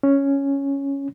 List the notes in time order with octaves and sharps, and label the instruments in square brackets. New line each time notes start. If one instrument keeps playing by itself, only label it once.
[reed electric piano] C#4